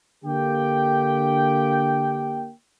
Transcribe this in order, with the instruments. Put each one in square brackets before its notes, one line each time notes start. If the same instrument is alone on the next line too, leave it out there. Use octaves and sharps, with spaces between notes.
[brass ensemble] D3 A#3 G4 G5